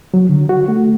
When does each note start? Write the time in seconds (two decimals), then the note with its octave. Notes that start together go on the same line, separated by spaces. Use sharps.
0.14 F#3
0.29 D3
0.49 F#4
0.68 A3